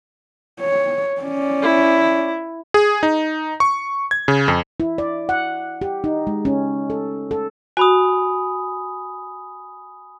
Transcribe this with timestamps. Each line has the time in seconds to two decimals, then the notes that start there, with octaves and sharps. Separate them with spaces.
0.61 C#5
1.22 C#4 D5
1.62 E4
2.74 G#4
3.03 D#4
3.60 C#6
4.11 G#6
4.28 C#3
4.48 F2
4.80 E4
4.98 D5
5.29 F#5
5.81 G4
6.04 D#4
6.27 G#3
6.45 C#4
6.90 A4
7.31 A4
7.77 F#4 G#5 B5 D#6